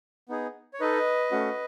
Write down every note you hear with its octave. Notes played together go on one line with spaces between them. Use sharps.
B3 D#4 G#4
C#5
D#4 A4 B4 D#5
A3 C#4 F#4